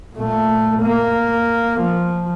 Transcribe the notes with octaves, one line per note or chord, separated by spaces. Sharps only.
A#2 A3
A#3
F3